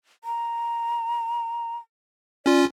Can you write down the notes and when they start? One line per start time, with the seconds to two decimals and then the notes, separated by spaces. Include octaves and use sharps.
0.24 A#5
2.46 C#4 F4 D5